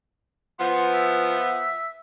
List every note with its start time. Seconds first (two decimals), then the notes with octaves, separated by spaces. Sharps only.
0.59 F3 B3 C6
0.93 E5